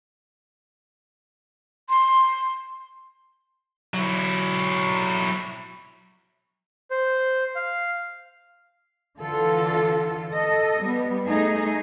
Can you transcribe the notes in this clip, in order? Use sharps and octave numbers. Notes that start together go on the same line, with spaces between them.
C6
F#3 E4
C5
F5
D3 E3 F4 A4
A4 D#5
G3 B3
A3 D#4 G#4